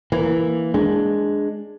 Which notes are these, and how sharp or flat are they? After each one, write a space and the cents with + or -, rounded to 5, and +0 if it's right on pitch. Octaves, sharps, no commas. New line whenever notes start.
E3 +0 A#3 +0
G#3 +0 D4 +0